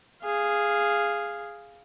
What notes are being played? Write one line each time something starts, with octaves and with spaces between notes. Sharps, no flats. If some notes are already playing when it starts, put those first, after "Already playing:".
G#4 F5